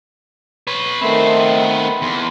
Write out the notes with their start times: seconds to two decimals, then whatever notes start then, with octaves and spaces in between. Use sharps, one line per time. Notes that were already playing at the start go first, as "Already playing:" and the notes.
0.67 B4 C#5
1.02 D#3 A3 B3 C4
2.02 E2 C6